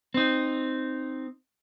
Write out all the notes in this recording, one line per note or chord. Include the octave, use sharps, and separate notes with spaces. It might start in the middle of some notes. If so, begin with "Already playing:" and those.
C4 D#4